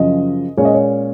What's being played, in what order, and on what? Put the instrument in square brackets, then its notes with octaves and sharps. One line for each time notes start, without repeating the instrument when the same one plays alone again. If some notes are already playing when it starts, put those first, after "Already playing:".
Already playing: [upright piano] F#2 C#3 F3 D#5
A#2 G#3 C#4 C#5
D#5
C#5